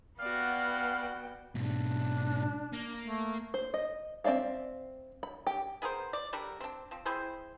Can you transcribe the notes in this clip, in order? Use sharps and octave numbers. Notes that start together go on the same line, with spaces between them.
B3 F#4 D5 F5 G5
G#2 B2 D4
A#3
A3
C5
D#5
C4 D#4 D5 E5 F5
B5
G4
B3 G#4 A#4 C5
D5
D3 G3 D4 A#4
C4 D4
F3 C4
C4 E4 G#4 C5